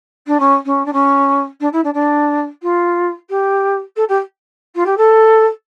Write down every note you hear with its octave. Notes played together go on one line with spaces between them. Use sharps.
D4
C#4
C#4
D4
C#4
D4
E4
D4
D4
F4
G4
A4
G4
F4
G4
A4